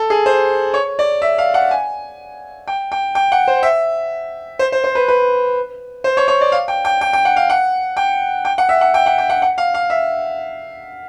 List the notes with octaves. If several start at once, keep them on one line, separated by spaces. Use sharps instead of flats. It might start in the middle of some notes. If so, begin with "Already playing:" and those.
Already playing: A4
G#4
C5
C#5
D5
E5
F5
F#5
G#5
G5
G5
G5
F#5
C5
E5
C5
C5
C5
B4
B4
C5
C#5
C#5
D5
F5
G5
G5
G5
G5
F#5
F5
F#5
G5
G5
F#5
E5
F#5
G5
F#5
G5
F#5
F#5
F5
F5
E5